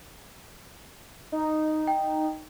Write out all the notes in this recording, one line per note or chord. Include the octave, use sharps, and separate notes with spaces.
D#4
G5